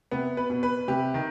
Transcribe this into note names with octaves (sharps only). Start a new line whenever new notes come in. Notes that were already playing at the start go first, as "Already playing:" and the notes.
C3 B3
B4
B2
B4
C3 G4
D#3